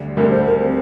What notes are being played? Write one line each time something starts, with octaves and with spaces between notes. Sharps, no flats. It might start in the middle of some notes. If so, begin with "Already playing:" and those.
Already playing: D2 D3 G3
D2 D3 G3 A#4
C5
A#4
C4